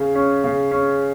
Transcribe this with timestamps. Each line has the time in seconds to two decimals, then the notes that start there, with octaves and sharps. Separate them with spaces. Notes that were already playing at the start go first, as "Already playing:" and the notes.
Already playing: C#3
0.15 C#4
0.44 C#3
0.71 C#4